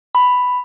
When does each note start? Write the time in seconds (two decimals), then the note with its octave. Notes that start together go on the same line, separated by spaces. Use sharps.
0.15 B5